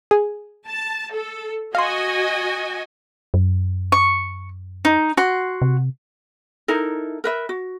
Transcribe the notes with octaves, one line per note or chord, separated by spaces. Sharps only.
G#4
A5
A4
F#4 D#5 F5 G#5 C6
F#2
C#6
D#4
F#4 C6
C3
D#4 E4 A4 A#4
A#4 B4 E5
F#4